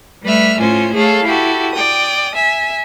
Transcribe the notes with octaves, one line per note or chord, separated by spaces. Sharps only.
G3 A3 B4 E5 F6
A2 C#4 F4 C5 G#5
A3 G#4 A4 C#5 F5
E4 F#4 G4 A4
D5 G5 D#6
E5 G#5